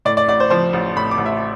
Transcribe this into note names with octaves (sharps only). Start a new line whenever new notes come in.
A2 D5
D5
A1 D5
C5
F3 C5
A1
A2 B5
D6
A1
E5